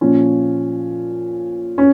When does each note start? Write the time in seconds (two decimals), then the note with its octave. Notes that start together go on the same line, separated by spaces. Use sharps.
0.01 A#2 F3 C#4
1.78 C#4